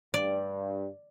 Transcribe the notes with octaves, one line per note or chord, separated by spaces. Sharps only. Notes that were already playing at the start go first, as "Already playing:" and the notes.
G2 D5